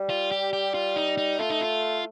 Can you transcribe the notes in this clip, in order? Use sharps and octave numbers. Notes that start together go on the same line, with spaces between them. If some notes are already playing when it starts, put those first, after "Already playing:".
Already playing: G3
F4
G4
G4
F4
D#4
D#4
A3 F4
D#4
F4